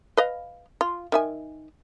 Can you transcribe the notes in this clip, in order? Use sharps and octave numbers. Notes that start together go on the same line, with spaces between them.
B4 D#5 F5
F4
D#3 E5 G#5